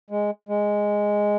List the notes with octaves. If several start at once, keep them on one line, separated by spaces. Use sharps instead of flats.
G#3
G#3